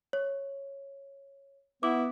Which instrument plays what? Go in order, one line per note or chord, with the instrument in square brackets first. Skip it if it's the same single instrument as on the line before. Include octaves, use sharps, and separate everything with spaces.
[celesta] C#5
[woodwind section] B3 [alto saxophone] E4 [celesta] D6